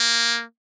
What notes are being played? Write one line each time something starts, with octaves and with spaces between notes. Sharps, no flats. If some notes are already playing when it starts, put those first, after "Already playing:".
Already playing: A#3